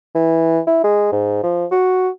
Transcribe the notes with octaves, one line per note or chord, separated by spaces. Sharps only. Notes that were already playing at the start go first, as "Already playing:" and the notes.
E3
E4
G#3
G#2
F3
F#4